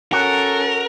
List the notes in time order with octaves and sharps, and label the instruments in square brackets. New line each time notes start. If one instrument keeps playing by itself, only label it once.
[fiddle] C#4 A4 [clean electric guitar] F#4 [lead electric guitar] A#4